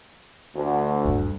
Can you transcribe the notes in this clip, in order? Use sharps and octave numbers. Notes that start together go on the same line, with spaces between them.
D2
D#1 G2